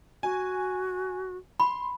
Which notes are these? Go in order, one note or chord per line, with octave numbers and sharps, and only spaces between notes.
F#4 G#5
B5 C6